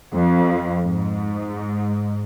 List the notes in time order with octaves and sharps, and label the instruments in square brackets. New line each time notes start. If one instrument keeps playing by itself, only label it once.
[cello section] F2
G#2